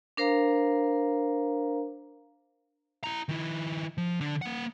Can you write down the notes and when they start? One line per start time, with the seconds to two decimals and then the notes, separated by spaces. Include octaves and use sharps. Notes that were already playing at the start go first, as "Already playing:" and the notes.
0.17 D4 A#4 C5 F5 A#5
3.04 E4 A#5
3.29 D#3 E4
3.98 F3
4.21 D3 D4
4.42 A#3 F#5